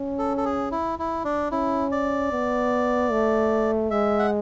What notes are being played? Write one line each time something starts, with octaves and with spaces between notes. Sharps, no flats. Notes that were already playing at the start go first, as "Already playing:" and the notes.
Already playing: C#4
A4
A4
G#4
E4
E4
D4
C#4 E4
D5
B3
A3
G#3 E5
F#5